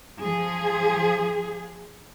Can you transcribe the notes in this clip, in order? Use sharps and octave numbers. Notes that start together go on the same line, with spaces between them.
F3 G#4